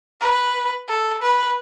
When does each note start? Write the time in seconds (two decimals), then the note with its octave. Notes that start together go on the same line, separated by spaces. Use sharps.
0.21 B4
0.88 A4
1.22 B4